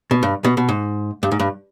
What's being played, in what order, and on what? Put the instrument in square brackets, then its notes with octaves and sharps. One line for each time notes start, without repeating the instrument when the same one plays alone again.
[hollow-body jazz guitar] B2
G2
B2
B2
G#2
G2
G#2
G2